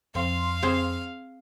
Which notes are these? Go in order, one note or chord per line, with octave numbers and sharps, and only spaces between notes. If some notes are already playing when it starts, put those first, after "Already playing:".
F2 C4 F5 C6
C4 G#4 C5